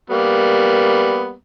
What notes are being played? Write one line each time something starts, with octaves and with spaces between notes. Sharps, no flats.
G3 A#3 B3